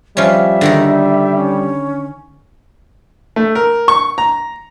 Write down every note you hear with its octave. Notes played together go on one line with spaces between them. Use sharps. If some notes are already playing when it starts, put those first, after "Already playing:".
F3 G3 C#4 E5
D3 D#3 D#4
C#4
A3
A#4
C#6
A#5